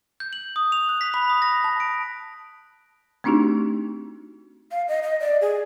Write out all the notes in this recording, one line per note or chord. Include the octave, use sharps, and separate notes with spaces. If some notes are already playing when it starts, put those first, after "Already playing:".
G6
F#7
D#6
F7
F#6
B6
B5
D#6
A#6
A5
D7
A3 C4 D4 D#4 F#4 G4
F5
D#5
D#5
D5
G#4